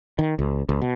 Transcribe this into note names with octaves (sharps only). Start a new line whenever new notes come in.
D#3
C#2
C#2
B2